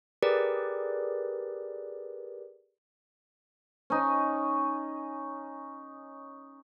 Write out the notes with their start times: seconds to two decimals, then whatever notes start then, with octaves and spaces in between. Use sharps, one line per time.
0.22 G4 G#4 A#4 B4 D5
3.90 C#4 D#4